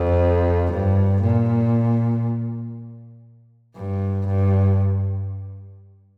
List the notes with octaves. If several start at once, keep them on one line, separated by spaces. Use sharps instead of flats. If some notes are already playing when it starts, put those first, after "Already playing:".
Already playing: F2
G2
A#2
G2
G2